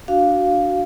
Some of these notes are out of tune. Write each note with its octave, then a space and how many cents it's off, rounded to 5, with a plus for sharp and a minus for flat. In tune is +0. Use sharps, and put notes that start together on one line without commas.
D4 +0 F#4 +0 F5 +0